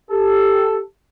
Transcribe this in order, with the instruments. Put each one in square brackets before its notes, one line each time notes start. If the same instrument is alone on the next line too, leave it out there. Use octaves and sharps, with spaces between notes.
[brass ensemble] G4 A4